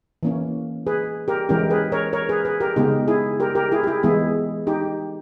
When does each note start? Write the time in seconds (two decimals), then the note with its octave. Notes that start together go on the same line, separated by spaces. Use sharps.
0.23 E3 A#3 C#4
0.87 G#4 B4
1.28 G4 A#4
1.49 E3 G#3 C#4 G4 A#4
1.70 G#4 B4
1.92 A#4 C#5
2.13 A#4 C#5
2.29 G#4 B4
2.45 G#4 B4
2.60 G4 A#4
2.76 C#3 G#3 B3 D#4 G4
3.08 E4 G#4
3.40 G4 A#4
3.55 G4 A#4
3.72 E4 G#4
3.83 G4
3.87 E4 G#4
4.03 E3 G#3 B3 E4 G#4
4.67 D#4 G4